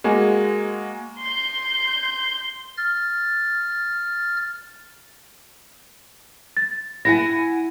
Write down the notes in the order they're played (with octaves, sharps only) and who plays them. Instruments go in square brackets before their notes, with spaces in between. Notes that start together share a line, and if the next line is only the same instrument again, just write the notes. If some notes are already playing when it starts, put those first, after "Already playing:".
[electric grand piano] G#3 A#3 F#4 G#5
[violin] C6 G6
[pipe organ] F6 A6
[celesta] A6
[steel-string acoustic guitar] E4 F#5 G#5 [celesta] A#6